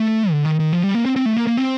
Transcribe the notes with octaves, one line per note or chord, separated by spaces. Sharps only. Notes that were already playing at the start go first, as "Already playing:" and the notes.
Already playing: A3
D3
D#3
D#3
F3
G3
A#3
C4
C4
A3
A#3
A#3
C4